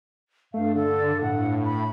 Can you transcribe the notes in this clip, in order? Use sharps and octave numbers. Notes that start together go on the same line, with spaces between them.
G2 A3 F5
D3 A4
A2 F#5
B5